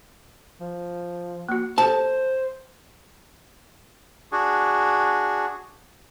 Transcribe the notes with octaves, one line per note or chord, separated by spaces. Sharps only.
F3
A#3 F#4
G4 A4 C5 A5
D4 F#4 G#4